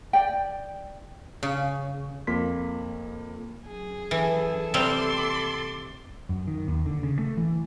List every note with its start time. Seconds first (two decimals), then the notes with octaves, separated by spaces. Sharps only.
0.13 D5 G5
1.43 C#3
2.27 F2 A#3 C6 B6
3.65 F#2 G#4
4.11 E3 A4
4.74 C3 G3 C4 C6 D6 A6
6.29 F#2
6.48 D#3
6.68 D#2
6.86 D3
7.03 C#3
7.19 A3
7.37 E3